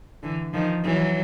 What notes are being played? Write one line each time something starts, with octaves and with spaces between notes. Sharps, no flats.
D3 E3
D#3 F3
E3 F#3